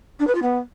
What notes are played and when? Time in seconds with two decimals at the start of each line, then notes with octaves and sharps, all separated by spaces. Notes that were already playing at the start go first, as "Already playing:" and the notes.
0.19 D4
0.27 B4
0.34 F4
0.42 B3